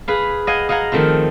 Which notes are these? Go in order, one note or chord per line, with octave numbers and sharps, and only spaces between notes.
G#4 B4 F5
D#5 F5 F#5 G#5
D#5 F5 F#5 G#5 A#5
D#3 F3 A3 C4 F4